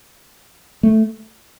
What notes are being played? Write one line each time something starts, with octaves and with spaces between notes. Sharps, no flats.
A3